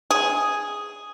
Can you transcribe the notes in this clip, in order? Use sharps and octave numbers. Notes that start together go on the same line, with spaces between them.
G#4